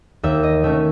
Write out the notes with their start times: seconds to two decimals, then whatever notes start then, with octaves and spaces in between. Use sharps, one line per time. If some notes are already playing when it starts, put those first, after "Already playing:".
0.23 D#2 E5
0.43 D#5
0.64 D#3 A3 C#4 E5